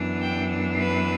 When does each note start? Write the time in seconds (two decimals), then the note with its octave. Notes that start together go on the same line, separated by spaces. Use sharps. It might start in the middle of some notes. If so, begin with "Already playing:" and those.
Already playing: F#2 E3 B3 D4
0.21 G5
0.78 B4